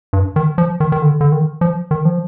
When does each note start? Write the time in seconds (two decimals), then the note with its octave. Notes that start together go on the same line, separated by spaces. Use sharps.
0.13 G2
0.36 D#3
0.58 F3
0.80 D#3
0.92 D#3
1.02 D3
1.21 D3
1.32 D#3
1.61 F3
1.91 D#3
2.05 F3